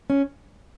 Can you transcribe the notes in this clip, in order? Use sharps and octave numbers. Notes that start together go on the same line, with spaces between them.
C#4